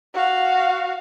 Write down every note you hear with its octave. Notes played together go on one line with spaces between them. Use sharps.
F#4 F5